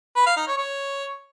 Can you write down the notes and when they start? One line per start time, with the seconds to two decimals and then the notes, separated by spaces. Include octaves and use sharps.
0.16 B4
0.27 F5
0.37 D#4
0.47 C#5
0.58 C#5